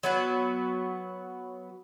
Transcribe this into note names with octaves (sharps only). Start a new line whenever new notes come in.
F#3 B3 F#4